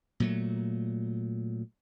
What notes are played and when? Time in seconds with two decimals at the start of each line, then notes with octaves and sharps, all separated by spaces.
0.20 A#2 F#3 A3